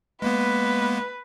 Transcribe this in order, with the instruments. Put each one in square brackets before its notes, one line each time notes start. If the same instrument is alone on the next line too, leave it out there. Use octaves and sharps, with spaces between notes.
[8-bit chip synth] G#3 A#3 B3 [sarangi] B4